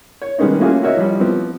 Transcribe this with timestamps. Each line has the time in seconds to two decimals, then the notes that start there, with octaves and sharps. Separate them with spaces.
0.22 C#5
0.38 D#3 G3 G#3 B3 C#4 D#4
0.60 A3 A#3 C#4 F4 F#4 G#4
0.82 E4 F#4 A#4 C#5 D#5 E5
0.97 F3 G3
1.20 F3 B3 C4